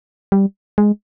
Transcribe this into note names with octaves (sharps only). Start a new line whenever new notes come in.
G3
G#3